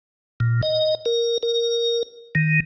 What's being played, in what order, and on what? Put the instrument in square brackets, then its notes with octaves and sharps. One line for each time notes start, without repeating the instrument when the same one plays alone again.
[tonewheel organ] A#2
D#5
A#4
A#4
D#3